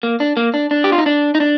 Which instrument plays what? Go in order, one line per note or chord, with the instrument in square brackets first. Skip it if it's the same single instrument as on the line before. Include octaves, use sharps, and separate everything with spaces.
[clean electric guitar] A#3
D4
A#3
D4
D4
G4
F4
D#4
D4
D#4
D4